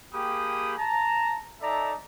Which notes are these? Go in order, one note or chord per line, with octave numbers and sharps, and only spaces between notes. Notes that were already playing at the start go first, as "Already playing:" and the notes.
A#3 G4 G#4 G5 B5 D#6
A5 A#5
D#4 A4 D5 E5 A5 A#5